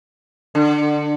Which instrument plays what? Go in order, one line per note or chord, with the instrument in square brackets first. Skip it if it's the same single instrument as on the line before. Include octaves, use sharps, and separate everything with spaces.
[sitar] D3